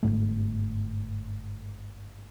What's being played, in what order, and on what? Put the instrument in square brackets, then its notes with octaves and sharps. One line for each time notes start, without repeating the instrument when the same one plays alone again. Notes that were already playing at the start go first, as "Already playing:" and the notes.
[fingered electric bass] G1 F2 G#2 A3